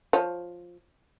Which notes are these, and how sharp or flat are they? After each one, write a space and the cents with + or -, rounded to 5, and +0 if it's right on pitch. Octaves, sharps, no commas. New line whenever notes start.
F3 +5 C#5 +0